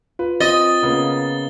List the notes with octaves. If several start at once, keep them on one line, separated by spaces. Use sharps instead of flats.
F4 B4
C4 D#5 A6 G7
C#3 A#3 B3